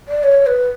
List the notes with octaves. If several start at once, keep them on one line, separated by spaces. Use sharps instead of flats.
D5
C#5
B4